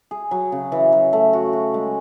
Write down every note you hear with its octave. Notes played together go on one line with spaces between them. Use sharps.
G#4
F#3
C#3
E3
F#3
A3
F#4
F#4
G#3